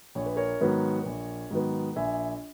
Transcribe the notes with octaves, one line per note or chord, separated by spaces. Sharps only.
A#1 C#5
B4
A#4 C#5
G#2 D#3 F#3 B3
A#1
G#2 D#3 F#3 B3
A#1 E5 G#5